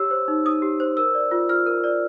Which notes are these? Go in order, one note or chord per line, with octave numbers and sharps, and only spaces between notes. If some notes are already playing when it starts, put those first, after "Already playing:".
Already playing: G4 C#5 E6
C5
D#4
D#4 D#6
G4
C5
A#4 E6
D5
F4
F4 F6
A#4
D5